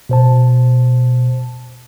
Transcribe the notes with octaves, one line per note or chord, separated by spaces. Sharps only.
B2 C5 A5